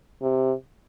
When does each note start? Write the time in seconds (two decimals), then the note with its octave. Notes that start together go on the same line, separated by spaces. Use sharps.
0.22 C3